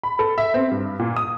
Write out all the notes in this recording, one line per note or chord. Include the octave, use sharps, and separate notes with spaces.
B5
A4
E5
C4
G2
A#2
D#6